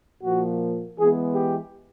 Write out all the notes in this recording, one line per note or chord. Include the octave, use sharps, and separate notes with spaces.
A#2 F3 A#3 F#4
E3 G#3 B3 G#4
G4